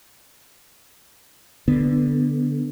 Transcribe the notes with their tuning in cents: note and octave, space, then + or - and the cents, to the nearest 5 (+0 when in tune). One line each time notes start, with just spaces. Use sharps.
D3 +0 B3 +0